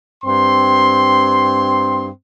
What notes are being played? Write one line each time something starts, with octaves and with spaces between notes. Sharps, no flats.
G2 C4 C6